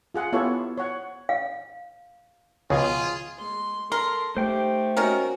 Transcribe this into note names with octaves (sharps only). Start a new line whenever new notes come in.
F4 G#4 F#5
B3 E4 F4 G4 A4 C#5
C#5 F#5
F5
C#2 B2 F3 F4 G#4
G#3 C6
A4 A#4 C6
A3 D#4 G4 C5 G5
D#3 A#3 C#4 F#4 A#4